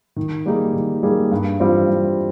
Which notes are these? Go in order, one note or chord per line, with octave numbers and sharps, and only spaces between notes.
D#3
G3 A#3 D#4 G#4
D#3
G3 A#3 D#4 G#4
G2
E3 G3 C4 F4
G2